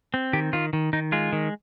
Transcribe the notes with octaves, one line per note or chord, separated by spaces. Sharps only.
C4
D#3 G4
D#3 F4
D#3
D#3 D#4
G#3 F4
D#3